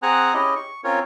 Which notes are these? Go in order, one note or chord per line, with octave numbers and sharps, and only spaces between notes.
C4 G#4 F#5 G#5 A#5 F#6
C#4 E4 G4 G#4 D#5
C#6
C4 C#4 F4 A#4 C#5